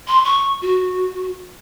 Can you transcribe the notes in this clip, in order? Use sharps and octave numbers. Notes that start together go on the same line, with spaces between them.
C6
C#6
F#4